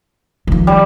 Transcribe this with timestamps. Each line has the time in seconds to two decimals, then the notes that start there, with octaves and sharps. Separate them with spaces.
0.47 D#3 F3
0.67 G3